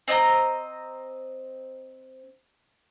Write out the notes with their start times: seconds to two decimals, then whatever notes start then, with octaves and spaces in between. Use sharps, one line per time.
0.08 C4 D#5 G5 A#5